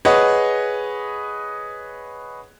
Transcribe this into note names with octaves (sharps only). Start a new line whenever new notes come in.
G#4 B4 C#5 D#5 F#5